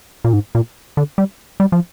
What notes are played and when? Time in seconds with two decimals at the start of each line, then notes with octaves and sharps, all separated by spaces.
0.25 A#2
0.33 G#2
0.55 A#2
0.97 D3
1.18 G3
1.60 G3
1.72 F3